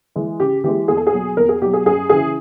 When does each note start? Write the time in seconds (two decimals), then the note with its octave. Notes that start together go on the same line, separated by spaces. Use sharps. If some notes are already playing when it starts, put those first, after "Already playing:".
0.16 E3 G#3
0.40 C#3 G4
0.64 E3 G#3 G4
0.88 E2 G#4
0.97 A4
1.07 G#4
1.12 B2 F#3
1.37 E2 A#4
1.49 G#4
1.61 B2 F#3 G4
1.73 G#4
1.85 F#2 G#4
2.10 C#3 E3 G#4